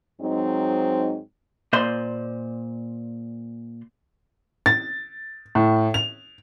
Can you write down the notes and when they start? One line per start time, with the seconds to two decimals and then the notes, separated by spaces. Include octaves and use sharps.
0.21 G#2 F#3 C4 D#4
1.73 A#2 C5 D5 D#5 C6
4.66 A6
5.55 A2
5.94 F7